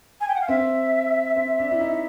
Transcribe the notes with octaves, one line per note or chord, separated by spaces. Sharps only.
G#5
G5
F#5
F5
C4 E5
C4
D4
E4
D#4